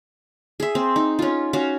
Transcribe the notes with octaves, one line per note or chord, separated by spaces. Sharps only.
G#4 E5
C4
D#4
C#4 F4
C#4 F#4 F5